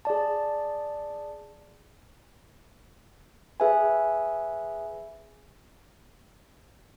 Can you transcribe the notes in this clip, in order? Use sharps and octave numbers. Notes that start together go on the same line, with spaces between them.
G#4 D5 A5
G#4 B4 E5 G#5